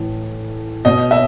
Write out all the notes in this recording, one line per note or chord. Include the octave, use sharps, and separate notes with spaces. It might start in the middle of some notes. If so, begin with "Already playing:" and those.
Already playing: A2 E3
B2 D#5
E5